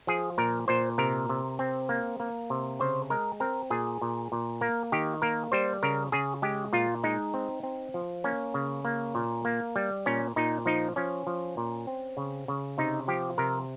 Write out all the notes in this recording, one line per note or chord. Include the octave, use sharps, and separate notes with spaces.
F3 G#4
A#2 A#4
A#2 C5
C3 A#4
C3
C4
A#3
A#3
C3
C#3 C5
G#3 A#4
C4 A#4
A#2 G#4
A#2
A#2
A#3 A#4
D#3 G4
A#3 A#4
G3 C5
C#3 A#4
C#3 G#4
G#3 G4
A#2 F4
G#3 D#4
C4
C4
F3
A#3 C#4
C#3
A#3
A#2
A#3
G3
A#2 C#4
A#2 D#4
F3 D#4
F3 C#4
F3
A#2
C4
C#3
C#3
C3 D#4
F3 G4
C3 A#4